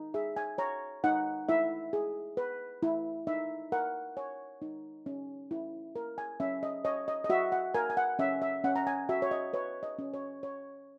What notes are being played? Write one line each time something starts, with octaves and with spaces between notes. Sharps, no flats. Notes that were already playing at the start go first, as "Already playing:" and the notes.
Already playing: D#4
G#4 E5
G#5
C#5 A#5
D#4 F#5
E4 E5
G#4
B4
E4
D#4 E5
A#4 F#5
C#5 G#5
D#4
C#4
E4
A#4
G#5
C#4 E5
D#5
C#5 D#5
D#5
D#5
F#4 E5
F#5
A#4 G#5
G#5
F#5
C#4 E5
E5
C#4 F#5
A#5
G#5
F#4 E5
C#5
D#5
B4 C#5
D#5
C#4
C#5
C#5